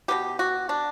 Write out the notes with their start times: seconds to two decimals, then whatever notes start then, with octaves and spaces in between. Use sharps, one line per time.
0.08 B2 F#3 B3 G4
0.39 F#4
0.69 D4